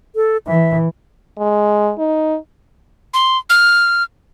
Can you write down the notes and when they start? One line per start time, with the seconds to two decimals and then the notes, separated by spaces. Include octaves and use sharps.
0.16 A4
0.47 E3 E5
1.38 G#3
1.98 D#4
3.14 C6
3.50 F6